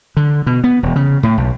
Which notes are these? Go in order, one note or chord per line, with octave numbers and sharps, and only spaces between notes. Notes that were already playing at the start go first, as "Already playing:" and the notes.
D3
B2
B3
E1
C#3
A2
B1